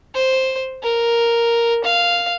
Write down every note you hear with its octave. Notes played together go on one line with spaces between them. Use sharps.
C5
A#4
F5